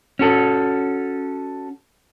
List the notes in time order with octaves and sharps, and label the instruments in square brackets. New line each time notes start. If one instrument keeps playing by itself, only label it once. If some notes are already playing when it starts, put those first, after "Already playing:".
[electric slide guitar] C#4 F#4 A4